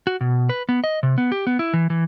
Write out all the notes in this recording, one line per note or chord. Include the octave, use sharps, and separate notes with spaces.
F#4
B2
B4
B3
D#5
C3
B3
G4
B3
E4
E3
E3